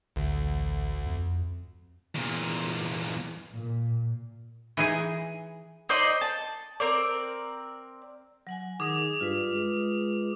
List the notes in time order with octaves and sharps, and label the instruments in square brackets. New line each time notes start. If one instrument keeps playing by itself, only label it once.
[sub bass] A1 [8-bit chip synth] D2
[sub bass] F2
[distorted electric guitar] E2 A#2
[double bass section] A#2
[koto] E3 D#4 G#4
[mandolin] D#4 C5 D5 D#5
A5
C4 A#4 D5
[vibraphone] F#3 F#5 G#5
[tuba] D#3 [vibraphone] G#4 [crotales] D6 D#6
[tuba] G2 [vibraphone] F4 B4
[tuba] G#3